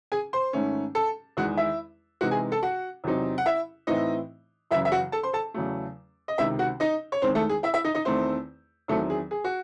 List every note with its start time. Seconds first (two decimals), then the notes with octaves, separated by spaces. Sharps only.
0.12 G#4 G#5
0.33 C5 C6
0.53 G#2 D#3 A3 C#4
0.95 A4 A5
1.37 E2 D#3 G#3 F#4 F#5
1.57 E4 E5
2.21 C3 E3 G#3 C4 D#4 F#4 F#5
2.31 G#4 G#5
2.52 A4 A5
2.63 F#4 F#5
3.04 E2 C3 F#3 C4 D#4
3.38 F#5
3.46 E4 E5
3.87 A2 E3 C4 D#4 E4 D#5
4.71 F#2 C#3 E3 E4 E5
4.85 E5
4.92 F#4 F#5
5.12 A4 A5
5.23 C5 C6
5.33 A4 A5
5.54 E2 C#3 F#3 A3
6.28 D#5
6.38 C#2 C3 D#3 E4 E5
6.59 F#4 F#5
6.80 D#4 D#5
7.12 C#5
7.22 E2 D#3 G#3 C4 C5
7.35 A3 A4
7.49 G#4
7.63 E4 E5
7.74 E4 E5
7.84 D#4 D#5
7.94 D#4 D#5
8.05 E2 D#3 A3 C4 E4 C5
8.88 E2 D#3 F#3 A3 C4 E4 A4
9.10 G#4
9.31 G#4
9.44 F#4